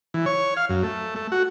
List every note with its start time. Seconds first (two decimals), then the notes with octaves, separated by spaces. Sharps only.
0.14 E3
0.26 C#5
0.57 F5
0.69 F#2
0.83 A3
1.16 A3
1.32 F#4